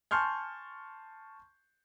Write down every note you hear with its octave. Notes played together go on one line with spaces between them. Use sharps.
G#5 A5 C6 C#6 F6 G6